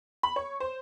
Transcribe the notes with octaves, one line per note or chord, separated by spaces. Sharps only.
B5
C#5
C5